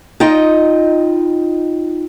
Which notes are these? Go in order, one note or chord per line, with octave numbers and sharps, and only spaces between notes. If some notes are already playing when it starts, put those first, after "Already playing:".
D#4 F4 D#5 G5